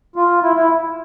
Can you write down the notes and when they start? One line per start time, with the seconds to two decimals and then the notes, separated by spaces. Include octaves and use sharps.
0.16 F4
0.43 E4
0.56 E4